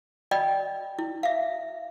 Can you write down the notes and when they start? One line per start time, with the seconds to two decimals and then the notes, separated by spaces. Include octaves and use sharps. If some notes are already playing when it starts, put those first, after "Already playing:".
0.31 D5 D#5 G5 B5
0.99 E4
1.23 E5 F5